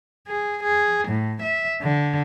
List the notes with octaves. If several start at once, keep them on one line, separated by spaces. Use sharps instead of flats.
G#4
G#4
A2
E5
D3